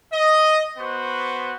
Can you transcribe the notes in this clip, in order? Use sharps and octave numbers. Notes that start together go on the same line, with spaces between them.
D#5
B3 F#4 C5